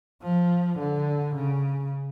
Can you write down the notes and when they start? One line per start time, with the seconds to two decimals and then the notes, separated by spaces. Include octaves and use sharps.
0.23 F3
0.79 D3
1.35 C#3